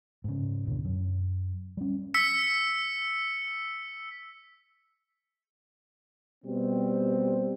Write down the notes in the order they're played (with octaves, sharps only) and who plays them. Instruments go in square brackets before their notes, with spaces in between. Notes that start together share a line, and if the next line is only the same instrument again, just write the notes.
[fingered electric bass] G#2 C#3
F1 C#2 B2 D3
F#2
G3 C#4
[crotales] E6 B6 C#7
[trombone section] B2 G3 C4